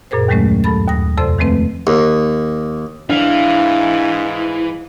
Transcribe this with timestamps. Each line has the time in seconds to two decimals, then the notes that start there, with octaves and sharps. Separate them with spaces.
0.11 F#2 A#2 G#4 A#4 C5
0.28 D#2 D#3 F#3 G#3 A3 C#4
0.64 G2 F#3 A4 A5 B5 A6
0.87 D#2 D#6 A#6
1.18 F2 C3 A4 C5 D5 C6
1.38 D#3 F3 G#3 A3 C4 B4
1.87 D#2
3.09 G#2 E3 D4 F5